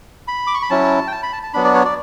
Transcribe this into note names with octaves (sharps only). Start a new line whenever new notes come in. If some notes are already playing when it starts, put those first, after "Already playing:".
B5
D6
C#6
B5
F#3 C#4 E4 A5
G5
A5
B5
A5
A5
F#3 B3 D4 B5
D5
C#5
D5